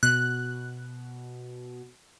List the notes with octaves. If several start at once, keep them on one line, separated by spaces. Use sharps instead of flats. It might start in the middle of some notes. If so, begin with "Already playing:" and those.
B2 F#6